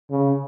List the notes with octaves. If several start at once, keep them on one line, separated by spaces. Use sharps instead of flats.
C#3